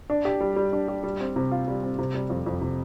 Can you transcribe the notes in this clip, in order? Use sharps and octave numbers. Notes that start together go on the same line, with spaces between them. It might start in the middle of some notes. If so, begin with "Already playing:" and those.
D4
G4
G3
G3
D4
G4
G3
C4
C3
F4
G3
C4
C3
G3
F2
F2
C3